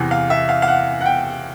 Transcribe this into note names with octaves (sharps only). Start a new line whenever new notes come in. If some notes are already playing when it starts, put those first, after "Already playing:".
Already playing: E2 C3 E3
F5
E5
F5
F5
F#5
F#5
G5